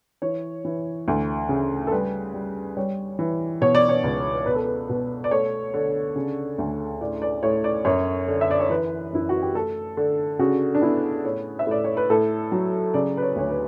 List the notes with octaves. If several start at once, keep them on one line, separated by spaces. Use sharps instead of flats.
E3 C#5
E3
D2
C#3
A4
G3 B4
G3
G3 C#5
E3
B2 C#5
D5
C#5
C#2
B2 B4
A4
B4
B2 B4
D5
A3 C#5
D3
C#3
D2
A2 D5
D5
A2 C#5
D5
F#2 C#5
D3
E5
D5
C#5
E3 B4
F#2 E4
F#4
G4
A3 A4
D3
C#3 F#4
D4
B3 E4
A2 C#5
E5
A2 D5
C#5
B4
A2 A4
F#3
C#3 D5
B4
C#5
D2 C#5
B4